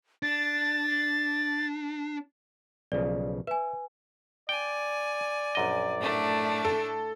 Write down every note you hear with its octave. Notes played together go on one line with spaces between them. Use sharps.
D4 A6
B1 C#3 F3 D5
B4 E5 G#5
D5 G5 G#5
A#1 F#2 D#5
A2 A3 D4
A4